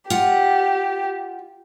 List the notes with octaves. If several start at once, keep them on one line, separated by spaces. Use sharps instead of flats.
F4 G4 F#5